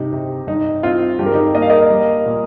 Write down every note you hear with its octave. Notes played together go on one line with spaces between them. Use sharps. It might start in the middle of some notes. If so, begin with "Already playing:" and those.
Already playing: G2 C3 D#4
C3
G2 D#4
C4 F4
G2 G4
A#4
D#4 G4
A#3 D#5
F5
A#4 D#5
G3
A#2